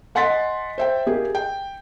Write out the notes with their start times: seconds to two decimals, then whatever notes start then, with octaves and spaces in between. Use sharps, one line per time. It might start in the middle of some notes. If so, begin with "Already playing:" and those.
0.15 D#5 F#5 G#5 C6 A6 B6
0.78 C5 E5 G5
1.07 A#3 G4 G#4
1.35 G5